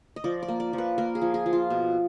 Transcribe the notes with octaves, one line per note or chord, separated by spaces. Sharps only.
D#5
F3 D5
D5
A#3
D5
F3
B4
A#3 A#4
G#4
F3
G#4
F3
F4
B2